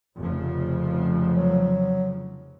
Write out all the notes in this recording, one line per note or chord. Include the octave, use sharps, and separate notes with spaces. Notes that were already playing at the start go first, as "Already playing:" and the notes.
F1 C#3 F3
F#3